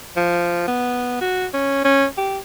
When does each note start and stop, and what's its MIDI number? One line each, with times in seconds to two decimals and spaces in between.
0.17 0.66 53
0.67 1.18 59
1.21 1.46 66
1.54 1.80 61
1.85 2.06 61
2.18 2.38 67